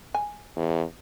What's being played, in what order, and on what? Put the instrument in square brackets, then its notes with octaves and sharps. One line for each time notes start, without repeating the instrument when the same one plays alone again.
[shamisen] G#5
[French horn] E2